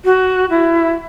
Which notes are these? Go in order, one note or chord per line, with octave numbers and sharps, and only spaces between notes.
F#4
E4